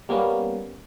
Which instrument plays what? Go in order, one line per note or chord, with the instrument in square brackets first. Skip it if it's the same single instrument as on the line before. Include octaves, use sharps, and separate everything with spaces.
[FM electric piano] G3 A#3 B3 C#4